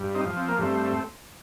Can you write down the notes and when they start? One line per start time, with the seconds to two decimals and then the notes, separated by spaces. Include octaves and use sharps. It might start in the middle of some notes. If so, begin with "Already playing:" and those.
Already playing: G2
0.15 C4 D#4
0.26 F3
0.37 C4
0.48 A#3
0.59 G2 A3 C4